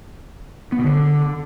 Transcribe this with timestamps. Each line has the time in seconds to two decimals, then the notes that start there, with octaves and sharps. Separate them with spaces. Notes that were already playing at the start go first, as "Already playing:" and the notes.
0.72 B3
0.78 B2
0.84 D3